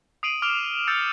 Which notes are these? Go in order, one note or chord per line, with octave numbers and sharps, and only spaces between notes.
D#6 C7 D7 D#7 F#7
D6 F6 D7 F7
E6 G6 A6 C#7 D7 F7